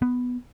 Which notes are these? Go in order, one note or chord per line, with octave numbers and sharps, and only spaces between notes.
B3